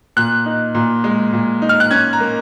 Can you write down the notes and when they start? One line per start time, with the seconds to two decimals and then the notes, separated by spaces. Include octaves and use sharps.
0.17 A#2 F#6
0.46 D#4
0.75 A#2
1.04 G#3
1.33 A#2
1.62 D#4
1.69 F6
1.80 F#6
1.91 C#4 G#6
2.13 A#5
2.20 A#3